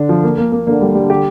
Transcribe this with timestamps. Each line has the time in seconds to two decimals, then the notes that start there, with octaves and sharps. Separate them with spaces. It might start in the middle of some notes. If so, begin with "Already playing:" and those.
Already playing: D3 D4
0.09 F3
0.24 A#3
0.38 A#3
0.52 A#3
0.67 D3 A#3
0.82 G3
0.95 G3
1.10 G4